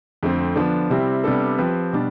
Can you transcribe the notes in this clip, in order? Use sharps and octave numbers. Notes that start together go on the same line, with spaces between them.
F2 D3 A3 C4
D3 F3 B3 D4
C3 G3 C4 E4 G4
C3 G3 B3 D4 A4
F3 C4 G4 B4
B2 G3 D4